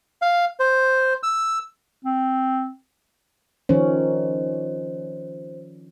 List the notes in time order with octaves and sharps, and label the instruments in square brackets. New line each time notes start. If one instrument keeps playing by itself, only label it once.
[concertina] F5
C5
E6
[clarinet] C4
[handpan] D#3 F3 C#4 [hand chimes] C5